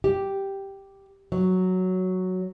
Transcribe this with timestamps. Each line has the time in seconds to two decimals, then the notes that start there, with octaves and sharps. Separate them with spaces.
0.04 G4
1.32 F#3